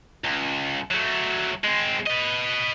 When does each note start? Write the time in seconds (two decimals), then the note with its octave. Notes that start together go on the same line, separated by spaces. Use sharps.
0.24 C#2
0.91 F#3 A3
1.64 G#3 C4
2.06 B4 D#5